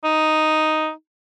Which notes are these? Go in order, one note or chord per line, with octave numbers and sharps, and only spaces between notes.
D#4